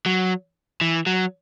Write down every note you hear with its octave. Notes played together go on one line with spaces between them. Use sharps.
F#3
E3
F#3